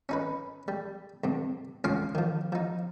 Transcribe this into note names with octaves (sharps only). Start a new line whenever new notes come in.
C#4 D#4 B4
G3
G2 C3
C#2 C#4 F4 F5 D6
D#3 F3
F3 D#4